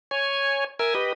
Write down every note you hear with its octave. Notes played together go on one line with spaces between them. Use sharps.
C#5 G#5
A#4 E5 G#5
G4 B4 D#5